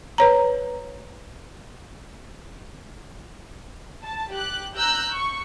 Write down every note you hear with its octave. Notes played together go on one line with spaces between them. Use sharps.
B4 C#5 A#5
A5
G4 F#6
A#5 E6 F#6 G6
C#6